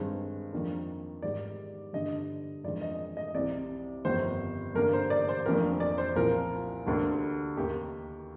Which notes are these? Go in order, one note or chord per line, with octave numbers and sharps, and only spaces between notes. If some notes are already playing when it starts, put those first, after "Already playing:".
Already playing: G2 D#3 G#3 C4
F2 D#3 A#3 D4
G#2 D#3 G3 D5
G2 D3 G3 D4 D#5
F2 D#3 G#3 D4 D5
D#5
D#5
C2 C3 G3 C4 D5
G1 F2 D#3 G3 C5
G2 D3 G3 A#3 D4 A#4
C5
D5
C5
F1 F2 D#3 A#3 D4 A#4
D5
C5
C2 A#2 F3 C4 A#4
D2 D3 G3 A#3 D4
D#2 D#3 A#3 G4